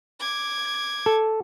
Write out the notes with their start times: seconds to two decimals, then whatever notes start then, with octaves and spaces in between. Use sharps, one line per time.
0.20 D6 G#6
1.06 A4